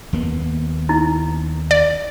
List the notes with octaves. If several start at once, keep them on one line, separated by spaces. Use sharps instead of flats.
D#2 A#3 B3
D#4 E4
D5